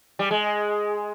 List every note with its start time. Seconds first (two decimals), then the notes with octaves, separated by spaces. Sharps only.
0.19 G3
0.31 G#3